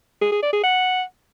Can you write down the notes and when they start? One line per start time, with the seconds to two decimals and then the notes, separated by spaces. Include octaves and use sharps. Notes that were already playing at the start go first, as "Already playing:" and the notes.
0.21 G#4
0.32 G#4
0.42 D5
0.53 G#4
0.63 F#5